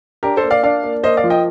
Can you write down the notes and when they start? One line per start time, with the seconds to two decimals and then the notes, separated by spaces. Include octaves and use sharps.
0.23 D4 G4 A#4
0.37 A4 C5
0.43 A#3
0.50 D5 F5
0.63 D4 D5 F5
0.83 A#3
1.03 A#3 C5 D#5
1.17 D5 F5
1.24 F3
1.30 D#5 G5